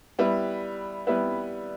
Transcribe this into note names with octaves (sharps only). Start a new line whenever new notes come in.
G3 B3 E4 B4
G3 B3 E4 B4